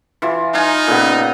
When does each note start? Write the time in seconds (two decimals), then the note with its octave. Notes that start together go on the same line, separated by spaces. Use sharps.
0.22 E3 F4
0.54 D#4 F5 G#5
0.87 A#2 C#3 B3